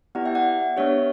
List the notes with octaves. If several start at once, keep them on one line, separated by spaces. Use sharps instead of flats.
B3 E4 G4 D5 F#5
E5 G5
D5 F#5
B3 D4 G4 C#5 E5